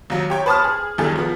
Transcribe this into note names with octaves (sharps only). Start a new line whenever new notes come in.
D#2 F#3
G4 C#5 G5
B4 C5 A5 C#6 D#6 F6
G#4
B1 E2 G2 D#3 G#4 A4
F3 B3